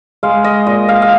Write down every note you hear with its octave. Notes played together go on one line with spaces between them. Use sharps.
G#3 F5
D#5
A#2 D#5
F5
F5